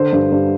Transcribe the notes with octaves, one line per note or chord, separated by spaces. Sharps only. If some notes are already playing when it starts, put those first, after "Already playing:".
Already playing: D3 C5
G2
G2